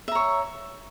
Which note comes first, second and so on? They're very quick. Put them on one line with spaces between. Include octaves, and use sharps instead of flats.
E5 A#5 C#5